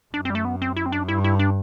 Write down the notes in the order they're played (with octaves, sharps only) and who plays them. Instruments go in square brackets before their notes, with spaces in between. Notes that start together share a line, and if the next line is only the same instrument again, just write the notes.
[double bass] F#2 [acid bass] D4
[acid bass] C4
G3
A3
B3
C4
E4
C4
D4
[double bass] G2 [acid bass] E4
[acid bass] E4
D4